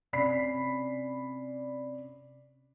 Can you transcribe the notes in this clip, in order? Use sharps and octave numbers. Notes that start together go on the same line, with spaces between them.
C3 C#4 D5 B5 B6 C7